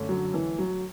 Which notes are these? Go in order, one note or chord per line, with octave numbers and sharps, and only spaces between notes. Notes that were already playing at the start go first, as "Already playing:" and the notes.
Already playing: F#2 D3 A3 C#4
F#3
E3
F#3